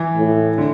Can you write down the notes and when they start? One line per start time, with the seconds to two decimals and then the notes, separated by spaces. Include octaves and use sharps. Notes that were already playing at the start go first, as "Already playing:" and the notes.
Already playing: E3
0.16 A2
0.58 D3